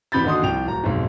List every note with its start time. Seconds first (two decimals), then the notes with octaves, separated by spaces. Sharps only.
0.12 E2 C3 B5 G6 A6
0.24 D#2 D3 D#4 F#4 C6 D#6
0.43 C2 F3 G5 F7
0.66 D1 A#5
0.83 B1 F2 G#2